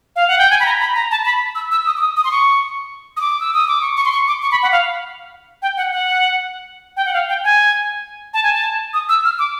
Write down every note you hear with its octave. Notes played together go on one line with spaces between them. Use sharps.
F5
F#5
G5
G#5
B5
A#5
B5
A#5
A5
B5
E6
E6
D#6
D6
D#6
D#6
C6
C#6
D#6
D6
E6
D#6
D6
C#6
C#6
C6
C#6
D6
C#6
B5
F#5
F5
G5
F#5
F#5
G5
F#5
F5
G5
G#5
A5
G#5
A5
D#6
E6
F6
D6